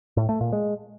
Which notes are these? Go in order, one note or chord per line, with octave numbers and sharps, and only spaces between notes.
A2
A3
A#2
G#3